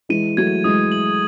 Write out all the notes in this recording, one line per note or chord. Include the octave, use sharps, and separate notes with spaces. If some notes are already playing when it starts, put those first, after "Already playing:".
E3 G#3 D#7
F#3 A3 G#6
E3 G#3 D#6
F#7